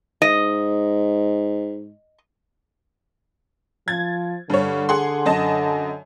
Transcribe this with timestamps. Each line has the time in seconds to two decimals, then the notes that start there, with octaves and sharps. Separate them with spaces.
0.22 G#2 D#5
3.88 F3 G#6 A6
4.50 G2 D3 C#5
4.89 G#4 F#5 C6
5.26 F#2 D#5 A5